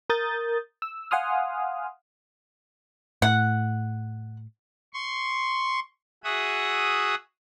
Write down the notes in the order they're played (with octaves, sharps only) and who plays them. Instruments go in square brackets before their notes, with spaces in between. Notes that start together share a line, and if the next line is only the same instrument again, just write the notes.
[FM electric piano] A#4 D#6 G6 A6
E6
F5 F#5 G#5 C6 D#6 F6
[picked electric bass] A2 [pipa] F#5
[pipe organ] C6 C#6
F#4 G#4 E5 F#5 D#6